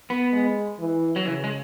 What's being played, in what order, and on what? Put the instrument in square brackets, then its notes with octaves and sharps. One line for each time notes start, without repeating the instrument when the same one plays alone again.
[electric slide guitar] B3
[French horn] G#3
E3
[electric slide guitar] F#3
[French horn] C#3 [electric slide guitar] E3
[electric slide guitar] G#3